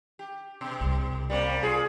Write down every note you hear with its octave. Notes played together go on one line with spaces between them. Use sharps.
G4
B2
C2
G3 A#3 C4
F4 G#4